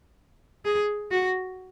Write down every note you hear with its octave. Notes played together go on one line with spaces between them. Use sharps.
G#4
F#4